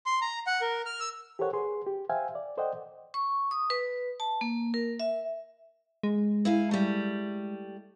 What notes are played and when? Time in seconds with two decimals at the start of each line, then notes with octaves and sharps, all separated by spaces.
0.06 C6
0.22 A#5
0.47 F#5
0.61 A#4
0.86 F6
1.00 E6
1.39 G4 A4 A#4 C5 C#5 F#5
1.53 G#4 B4 C6
1.86 G4
2.09 C5 E5 F5 G5 G#5
2.35 D5
2.57 A4 C5 D5 D#5 F#5 G5
3.14 C#6
3.51 D#6
3.70 B4
4.20 A5
4.41 A#3
4.74 A#4
5.00 E5
6.03 G#3
6.45 E4 F5 G#5
6.71 G3 A3